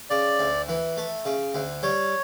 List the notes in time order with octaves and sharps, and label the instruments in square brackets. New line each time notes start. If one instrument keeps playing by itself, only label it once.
[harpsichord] C#3 [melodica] D5
[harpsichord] D2
E3
A3
C#3
D2
[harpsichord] G3 [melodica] C#5